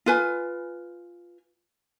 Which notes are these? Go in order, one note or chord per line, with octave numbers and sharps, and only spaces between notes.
F4 B4 G#5